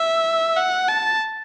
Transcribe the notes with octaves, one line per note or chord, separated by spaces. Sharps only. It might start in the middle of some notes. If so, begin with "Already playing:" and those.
Already playing: E5
F#5
A5